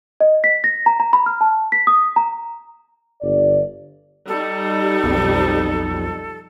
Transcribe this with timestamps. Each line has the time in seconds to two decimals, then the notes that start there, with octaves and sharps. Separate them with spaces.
0.20 D#5
0.44 B6
0.64 A#6
0.86 A#5
1.00 A#5
1.13 B5
1.26 F6
1.41 A5
1.72 B6
1.87 D#6
2.16 A#5
3.22 G1 D5
4.28 G3 D#4 A4
5.03 B1 F2